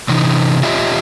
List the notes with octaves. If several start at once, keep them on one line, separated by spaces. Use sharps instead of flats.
C3 E3 D#4
F4 G4 C#5 D#5 E5